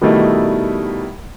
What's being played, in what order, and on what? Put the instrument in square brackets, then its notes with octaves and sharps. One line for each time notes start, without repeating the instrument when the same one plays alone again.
[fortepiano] B2 D#3 G3 A3 D#4 E4